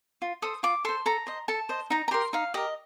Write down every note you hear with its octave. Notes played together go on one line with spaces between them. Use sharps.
F4
A4 C5 D#6
F4 D6
A4 C5 C6
A4 A#5
C5 D#5
A4 A5
C5 D#5
D#4 A#5
A#5
G4 A#4 C6
D#4 F5
G4 A#4 D#5